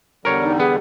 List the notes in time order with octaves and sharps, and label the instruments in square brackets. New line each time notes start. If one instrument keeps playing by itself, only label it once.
[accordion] E2 D3 G3 [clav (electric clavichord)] A#4 C#5
[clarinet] D#4
[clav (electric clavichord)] B3 [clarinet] G#4